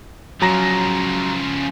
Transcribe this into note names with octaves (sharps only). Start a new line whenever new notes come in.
C#3 F3 F#3 A#5 A#6